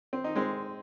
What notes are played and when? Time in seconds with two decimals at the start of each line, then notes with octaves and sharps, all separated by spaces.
0.13 C4
0.24 D#4
0.35 G#3 C4